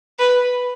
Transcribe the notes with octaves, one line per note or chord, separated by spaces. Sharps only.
B4